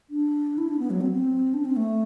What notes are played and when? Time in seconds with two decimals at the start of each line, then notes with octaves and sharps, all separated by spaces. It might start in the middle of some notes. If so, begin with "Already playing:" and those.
0.10 D4
0.58 E4
0.69 D4
0.79 B3
0.90 F#3
1.01 C4
1.12 C4
1.54 D4
1.65 C4
1.76 A3